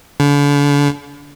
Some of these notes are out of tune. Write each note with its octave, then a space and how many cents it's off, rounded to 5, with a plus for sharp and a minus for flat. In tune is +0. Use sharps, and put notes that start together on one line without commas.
D3 -40